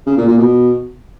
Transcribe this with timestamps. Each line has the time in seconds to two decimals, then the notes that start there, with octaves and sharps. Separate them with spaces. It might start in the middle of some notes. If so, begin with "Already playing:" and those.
0.07 C#3
0.17 A#2
0.28 A#2
0.38 B2